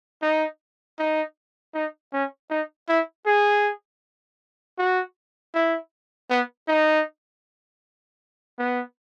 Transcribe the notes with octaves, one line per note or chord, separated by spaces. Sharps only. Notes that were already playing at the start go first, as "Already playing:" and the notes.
D#4
D#4
D#4
C#4
D#4
E4
G#4
F#4
E4
B3
D#4
B3